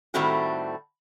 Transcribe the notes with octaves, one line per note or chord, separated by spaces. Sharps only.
A2 D#3 G3 A3 C4 F#4